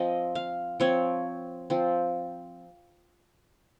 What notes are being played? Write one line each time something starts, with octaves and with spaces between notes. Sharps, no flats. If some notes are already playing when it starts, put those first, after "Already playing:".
Already playing: F3 C4 D#5
F5
F3 C4 C#5
F3 C4